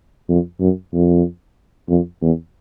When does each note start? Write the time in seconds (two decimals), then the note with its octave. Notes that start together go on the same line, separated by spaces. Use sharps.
0.29 F2
0.60 F#2
0.93 F2
1.89 F2
2.22 E2